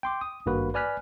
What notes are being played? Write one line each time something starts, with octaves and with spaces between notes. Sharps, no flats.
G5 C6 D6
D#6
G#1 G2 A#3 F#4 B4
B4 D5 G#5 F6 F#6 B6